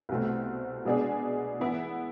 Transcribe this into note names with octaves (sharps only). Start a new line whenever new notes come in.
C2 B2 A3 C4
B2 G#3 B3 D4 G#4
E3 B3 E4